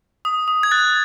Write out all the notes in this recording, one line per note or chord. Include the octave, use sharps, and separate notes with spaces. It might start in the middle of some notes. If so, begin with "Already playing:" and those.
D#6
D#6
G#6
F#6 A6